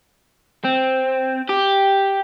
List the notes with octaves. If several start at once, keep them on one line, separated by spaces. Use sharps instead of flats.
C4
G4